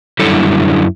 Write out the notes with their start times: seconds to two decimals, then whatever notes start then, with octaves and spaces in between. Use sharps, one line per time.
0.19 F#2 D3 G3 E4 A4